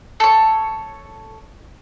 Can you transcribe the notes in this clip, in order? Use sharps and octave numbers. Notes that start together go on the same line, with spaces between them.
A4 C#5